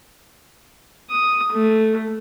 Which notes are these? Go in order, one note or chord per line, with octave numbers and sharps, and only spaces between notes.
D#6
A3